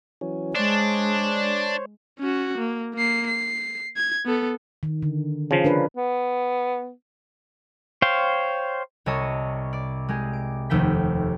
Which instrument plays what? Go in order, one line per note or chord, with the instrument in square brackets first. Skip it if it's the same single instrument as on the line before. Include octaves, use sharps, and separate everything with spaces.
[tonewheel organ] E3 F#3 C#4
[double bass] G#3 [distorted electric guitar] D4 [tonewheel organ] C5 C#5
[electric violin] C#4 F#4
A#3
A#3 C7
C7
G#6
B3 A4
[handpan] D#3
D3
[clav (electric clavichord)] C#3 F3
[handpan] D4 A#4 B4
[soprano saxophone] B3
[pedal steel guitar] C5 C#5 F5 G5
[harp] C2 C#5 D#5 A5 D#6
D5
G#3 G4 G#4
D7
F1 D#2 A3 G5 B6